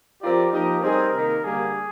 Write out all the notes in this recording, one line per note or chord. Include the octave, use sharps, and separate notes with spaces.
F3 C4 F4 G4 A#4 D5
F3 A#3 D#4 G4 A#4 D#5
G3 C4 D#4 G#4 A#4
C3 D#3 A#3 D#4 A#4
D3 G3 A#3 G#4